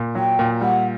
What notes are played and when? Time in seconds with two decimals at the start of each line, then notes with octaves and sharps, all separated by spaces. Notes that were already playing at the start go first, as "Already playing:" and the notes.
Already playing: A#2
0.15 F#3 G5
0.39 A#2
0.61 G3 F#5